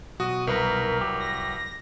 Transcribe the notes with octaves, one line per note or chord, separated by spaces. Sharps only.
B1 F#4 D#6
C2 A#4 B4
F#3 G4
A#6